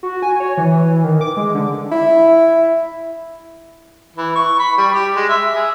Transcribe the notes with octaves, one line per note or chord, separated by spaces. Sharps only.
F#4
G#5
C#5
E3
D#3
D6
G#3
D3
E4
E3
C#6
B5
G3
G4
G#3
E5
G#4